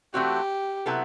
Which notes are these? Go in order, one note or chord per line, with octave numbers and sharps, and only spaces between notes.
E3 A3 C4 F#4 G4
C3 F#3 B3 E4 A4